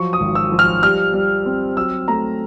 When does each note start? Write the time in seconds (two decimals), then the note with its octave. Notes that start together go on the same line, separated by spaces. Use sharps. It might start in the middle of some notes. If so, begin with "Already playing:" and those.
Already playing: F3 F#3 C#6
0.13 D#6
0.20 G#1
0.35 E6
0.52 F3
0.59 F6
0.82 G3 F6
1.14 G3
1.45 C4
1.77 F#3 E6
2.08 A3 A#5